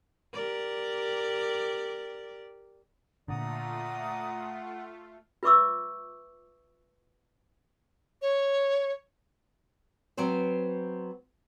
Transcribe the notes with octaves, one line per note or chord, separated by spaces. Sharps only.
G4 A#4 D5
A#2 D3 A3 F4 D5 F#5 A#5 D#6
F4 B4 E5 C#6 D6 E6
C#5
F#3 B3 C4 C5